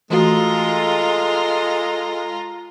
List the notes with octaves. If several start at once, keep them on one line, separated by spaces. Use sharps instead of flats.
E3 G#3 A3 F4 F#4 A4 A#5